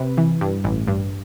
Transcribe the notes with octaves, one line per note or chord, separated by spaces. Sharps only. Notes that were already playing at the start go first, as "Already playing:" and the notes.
Already playing: C3 B4
E3
G2
A1
G2